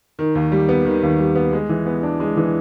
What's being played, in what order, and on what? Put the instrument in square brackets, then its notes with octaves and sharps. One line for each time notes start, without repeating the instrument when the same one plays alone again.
[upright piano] D#3
D#2
G3
B3
D#3
D#2
G3
B3
G#3
E3
B3
D4
G#3
E3